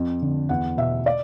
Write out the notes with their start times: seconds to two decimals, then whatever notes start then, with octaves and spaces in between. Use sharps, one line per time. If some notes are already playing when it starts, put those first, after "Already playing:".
Already playing: F2
0.22 D3
0.49 E2 F#5
0.77 B2 E5
1.06 D5